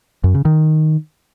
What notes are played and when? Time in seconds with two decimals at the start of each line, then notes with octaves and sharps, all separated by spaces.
0.24 F#2
0.34 C#3
0.45 D#3